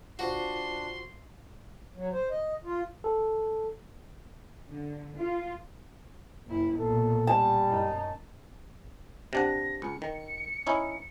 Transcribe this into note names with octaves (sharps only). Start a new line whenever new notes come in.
D4 F4 F#4 C5 C6
F#3
C5
D#5
F4
A4
D3
F4
F#1 E4
B1 A#2 A4
G3 A5
F#2 D#4
C3 D4 F#5 A#6
C#2 C#7
D#3
C#4 D#4 E4